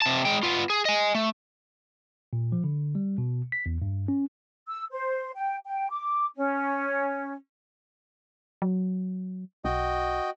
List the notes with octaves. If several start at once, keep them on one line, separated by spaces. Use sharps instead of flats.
C3 A5
G#3 G5
B3 F4
G#4
D#5 G#5
A3
A#2
F3
D3
G3
B2
B6
E2
G2
C#4
E6
C5
G5
G5
D6
C#4
F#3
B1 F#4 D#5 G5